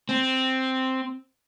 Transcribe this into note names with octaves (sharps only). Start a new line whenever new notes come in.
C4